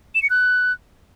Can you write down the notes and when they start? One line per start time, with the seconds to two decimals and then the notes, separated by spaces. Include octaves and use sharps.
0.15 E7
0.22 C#7
0.30 F#6